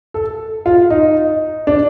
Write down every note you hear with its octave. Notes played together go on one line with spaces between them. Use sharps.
A4
F4
D#4
D4